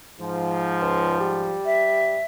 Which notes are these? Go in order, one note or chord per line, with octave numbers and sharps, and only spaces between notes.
G#2 F3
C#2
G3
E5